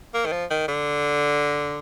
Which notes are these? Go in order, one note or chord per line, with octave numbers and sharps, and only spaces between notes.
A#3
D#3
F3
D#3
D3